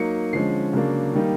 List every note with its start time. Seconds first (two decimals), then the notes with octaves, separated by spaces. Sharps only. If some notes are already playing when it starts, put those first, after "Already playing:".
Already playing: F#3 A#3 D#4 C#7
0.33 D3 F3 G#3 C#4 C7
0.73 C#3 F#3 A#3 D4
1.13 D#3 G3 A#3 D#4